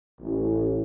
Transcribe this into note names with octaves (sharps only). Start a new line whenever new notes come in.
A1